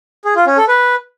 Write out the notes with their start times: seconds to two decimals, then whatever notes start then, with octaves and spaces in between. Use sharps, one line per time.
0.25 G#4
0.36 F4
0.47 C#4
0.57 A4
0.68 B4